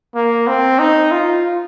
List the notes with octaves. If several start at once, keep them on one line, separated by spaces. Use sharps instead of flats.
A#3
C4
D#4
F4